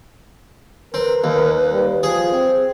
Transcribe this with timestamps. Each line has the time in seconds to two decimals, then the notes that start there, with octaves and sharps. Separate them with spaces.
0.94 C4 A#4 B4
1.24 D#2
1.72 G3
2.03 F3 G#4
2.32 C4